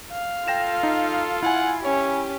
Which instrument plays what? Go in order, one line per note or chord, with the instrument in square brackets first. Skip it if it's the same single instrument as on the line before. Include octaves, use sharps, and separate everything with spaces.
[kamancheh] F5
[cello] F4 [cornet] A4 [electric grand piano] G5 A#6 E7
[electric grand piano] D#4
[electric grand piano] E4 G#5 [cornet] F#5
[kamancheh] C#4 [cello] G4 [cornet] C#5